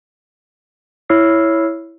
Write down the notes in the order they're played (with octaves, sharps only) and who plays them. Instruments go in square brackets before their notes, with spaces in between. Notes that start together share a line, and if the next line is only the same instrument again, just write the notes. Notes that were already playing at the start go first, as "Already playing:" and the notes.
[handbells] E4 C#5 E6 F6 C7